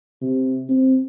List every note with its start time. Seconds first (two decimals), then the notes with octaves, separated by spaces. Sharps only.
0.22 C3
0.69 C4